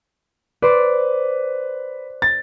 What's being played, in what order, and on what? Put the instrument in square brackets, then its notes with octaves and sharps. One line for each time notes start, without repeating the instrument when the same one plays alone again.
[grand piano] B4 [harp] C5 D5
[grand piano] A6